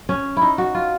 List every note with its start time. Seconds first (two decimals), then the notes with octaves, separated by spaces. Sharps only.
0.09 C#4
0.37 E4
0.42 D#4
0.58 F#4
0.75 F4